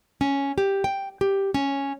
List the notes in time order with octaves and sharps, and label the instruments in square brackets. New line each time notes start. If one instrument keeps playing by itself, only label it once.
[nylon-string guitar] C#4
G4
G5
G4
C#4